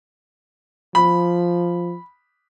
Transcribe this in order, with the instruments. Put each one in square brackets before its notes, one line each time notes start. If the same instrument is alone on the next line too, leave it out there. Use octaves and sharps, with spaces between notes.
[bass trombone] F3 [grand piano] B5